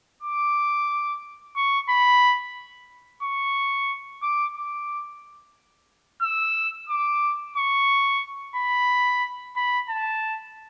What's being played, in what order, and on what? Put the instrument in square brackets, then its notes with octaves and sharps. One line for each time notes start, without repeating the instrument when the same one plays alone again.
[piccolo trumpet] D6
C#6
B5
C#6
D6
D6
E6
D6
C#6
B5
B5
A5